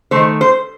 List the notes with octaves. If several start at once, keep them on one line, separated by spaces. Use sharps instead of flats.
D#3 A3 C5
C5